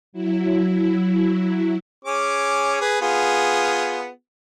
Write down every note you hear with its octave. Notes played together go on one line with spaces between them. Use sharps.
F#3 E4
C#4 G#4 D6
G#4 B4
B3 F4 G#4